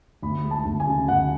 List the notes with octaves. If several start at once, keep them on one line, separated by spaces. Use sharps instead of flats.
D2 B5
G#3
A5
D2
G#5
C#3
D2 F#5